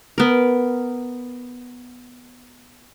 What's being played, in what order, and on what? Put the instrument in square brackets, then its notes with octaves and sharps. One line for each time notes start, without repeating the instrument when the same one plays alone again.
[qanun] B3 A#4